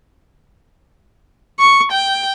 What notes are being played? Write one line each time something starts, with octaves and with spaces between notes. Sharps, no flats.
C#6
G5